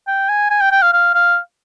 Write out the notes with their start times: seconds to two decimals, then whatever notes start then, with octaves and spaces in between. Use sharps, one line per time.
0.07 G5
0.29 G#5
0.50 G#5
0.61 G5
0.72 G5
0.82 F5
0.93 F5
1.14 F5